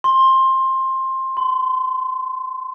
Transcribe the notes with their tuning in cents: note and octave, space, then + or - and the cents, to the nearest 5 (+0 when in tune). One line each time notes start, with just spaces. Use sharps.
C6 +15
C6 -30